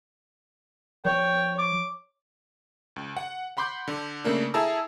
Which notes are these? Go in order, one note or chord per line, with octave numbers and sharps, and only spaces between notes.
F3 C#5 G5
D6
C#2
F#5
F#5 B5 C6 D6 G6
D3
C#3 A3 A#3 D4
E4 G#4 A4 A5 A#5 E6